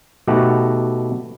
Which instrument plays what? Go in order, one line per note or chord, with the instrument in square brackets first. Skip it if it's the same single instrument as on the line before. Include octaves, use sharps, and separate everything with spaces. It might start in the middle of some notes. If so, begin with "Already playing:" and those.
[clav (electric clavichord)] B2 A3 D#4 F#4 G4 F#5